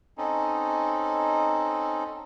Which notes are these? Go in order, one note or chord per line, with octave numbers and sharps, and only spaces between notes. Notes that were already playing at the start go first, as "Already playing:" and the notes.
C4 C#4 D#4 A4